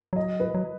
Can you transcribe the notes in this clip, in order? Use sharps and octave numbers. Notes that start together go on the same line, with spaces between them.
F#3 D#5
B4
F#3